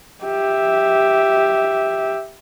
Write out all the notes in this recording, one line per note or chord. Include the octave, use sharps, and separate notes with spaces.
G4 E5